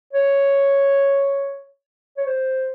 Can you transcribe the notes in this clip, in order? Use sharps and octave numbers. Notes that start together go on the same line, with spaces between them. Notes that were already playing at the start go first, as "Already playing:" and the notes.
C#5
C#5
C5